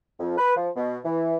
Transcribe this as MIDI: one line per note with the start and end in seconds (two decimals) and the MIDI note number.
0.20 0.35 41
0.38 0.55 71
0.56 0.68 53
0.76 0.98 47
1.04 1.37 52